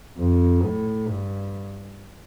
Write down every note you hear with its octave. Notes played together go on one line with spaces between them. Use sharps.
F2
A2
G2